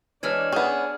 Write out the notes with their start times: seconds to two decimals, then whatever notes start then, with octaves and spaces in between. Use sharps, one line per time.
0.23 E3 G#3 D4 C#5 A5 F6 G#6
0.52 B3 C#4 G#4